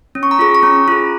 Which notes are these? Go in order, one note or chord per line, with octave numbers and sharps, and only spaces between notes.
C#4
C#6
A#5
F4 G#4 C#6
C#6
C#4 A#5
F4 G#4